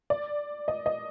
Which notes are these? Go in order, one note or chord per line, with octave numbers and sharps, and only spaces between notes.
D5
D#5
D#5